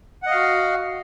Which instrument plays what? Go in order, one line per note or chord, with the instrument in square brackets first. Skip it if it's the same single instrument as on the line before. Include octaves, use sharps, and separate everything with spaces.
[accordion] F#5
D#5
F5
F#4